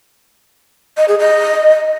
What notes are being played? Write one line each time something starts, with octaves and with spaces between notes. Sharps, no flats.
D#5
G#4
D#5